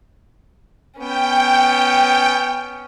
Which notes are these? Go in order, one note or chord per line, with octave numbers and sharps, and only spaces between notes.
B3 C#4 G5